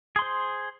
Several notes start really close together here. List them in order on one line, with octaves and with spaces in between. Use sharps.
G#4 C6 C5